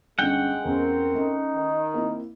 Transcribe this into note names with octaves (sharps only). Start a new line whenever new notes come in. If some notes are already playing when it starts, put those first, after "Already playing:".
G1 G#3 C#4 F#5 G5
E2 C4 C#4 A#4
A3 C#4 D#4
D#3
A#3 C4 E4